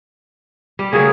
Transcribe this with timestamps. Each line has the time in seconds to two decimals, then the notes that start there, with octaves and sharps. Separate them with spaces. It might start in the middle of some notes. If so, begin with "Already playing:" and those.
0.79 G3
0.93 C#3 F#3 G#4 A#4